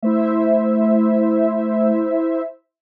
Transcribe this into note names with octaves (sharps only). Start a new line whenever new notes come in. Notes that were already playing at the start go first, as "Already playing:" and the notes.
A3 E4 C5 E5